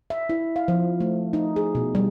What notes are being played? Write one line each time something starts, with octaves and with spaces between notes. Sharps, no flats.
E5
E4
F5
F3
A3
D#4
G#4
B2
G3